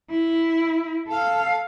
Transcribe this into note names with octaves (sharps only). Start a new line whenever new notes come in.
E4
A4 F5